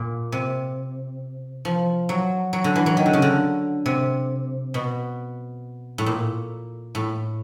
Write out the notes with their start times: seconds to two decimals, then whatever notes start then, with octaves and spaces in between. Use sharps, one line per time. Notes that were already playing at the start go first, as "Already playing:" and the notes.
Already playing: A#2
0.32 C3
1.65 F3
2.09 F#3
2.53 F#3
2.64 D3
2.76 E3
2.86 F#3
2.97 D#3
3.06 D3
3.13 C#3
3.22 D3
3.86 C3
4.74 B2
5.98 A2
6.06 A#2
6.95 A2